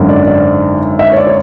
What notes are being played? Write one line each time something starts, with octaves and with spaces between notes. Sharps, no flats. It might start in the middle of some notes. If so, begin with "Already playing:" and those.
Already playing: G#1 F#2 D3
D5
D5
E5
C#5
D5
C#5